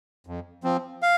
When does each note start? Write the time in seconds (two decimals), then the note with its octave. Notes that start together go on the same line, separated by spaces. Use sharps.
0.27 F2
0.64 F3 C4
1.02 F5